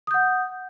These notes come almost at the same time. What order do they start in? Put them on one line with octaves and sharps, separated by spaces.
D#6 G6 F#5